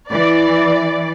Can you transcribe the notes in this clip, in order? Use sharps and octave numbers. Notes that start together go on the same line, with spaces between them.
E3 D5